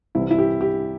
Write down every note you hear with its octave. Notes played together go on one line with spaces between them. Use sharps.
C2 C3 E3 E4
E4
G4
G4